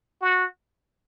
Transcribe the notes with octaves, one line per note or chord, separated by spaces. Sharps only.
F#4